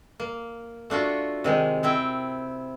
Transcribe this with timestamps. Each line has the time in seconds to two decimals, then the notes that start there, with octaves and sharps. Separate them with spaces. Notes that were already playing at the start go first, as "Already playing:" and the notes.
0.20 A#3
0.90 A3 D4 F4 F#4
1.44 C3 D#3 G#3
1.83 C4 E4 G5